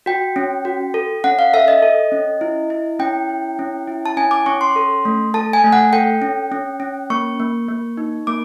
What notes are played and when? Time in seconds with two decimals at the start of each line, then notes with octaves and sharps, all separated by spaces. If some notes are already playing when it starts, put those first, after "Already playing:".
0.06 F#4 G5
0.36 C#4
0.65 F#4
0.94 A4
1.24 C#4 F#5
1.39 F5
1.54 A4 E5
1.68 D#5
1.82 A4
2.12 C#4
2.41 E4
2.70 E4
2.99 C#4 G5
3.29 E4
3.59 C#4
3.87 E4
4.06 A5
4.17 C#4 G#5
4.31 D6
4.46 C#4 C#6
4.61 C6
4.76 A4
5.05 A3
5.34 A4 A5
5.53 G#5
5.64 A3
5.73 F#5
5.93 A4 G5
6.22 C#4
6.52 C#4
6.80 C#4
7.10 A#3 C#6
7.40 A#3
7.68 A#3
7.97 D#4
8.27 A#3 D6